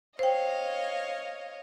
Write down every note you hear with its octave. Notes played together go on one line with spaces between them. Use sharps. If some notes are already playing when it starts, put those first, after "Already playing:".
C5 C#5 D#5 F5 G5